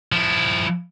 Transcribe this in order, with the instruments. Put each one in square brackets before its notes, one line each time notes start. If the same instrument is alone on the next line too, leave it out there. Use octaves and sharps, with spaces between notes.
[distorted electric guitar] F3 E4